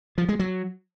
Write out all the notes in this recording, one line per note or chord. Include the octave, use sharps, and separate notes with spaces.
F3
G#3
F#3